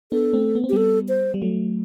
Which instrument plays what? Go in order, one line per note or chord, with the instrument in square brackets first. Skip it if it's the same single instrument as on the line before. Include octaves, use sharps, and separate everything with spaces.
[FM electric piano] B3 D4 [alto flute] A4
[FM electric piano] A3 C4
B3
C4
[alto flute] G4
[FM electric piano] G3 B3 [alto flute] A4
[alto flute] C5
[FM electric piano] G3
F#3 A3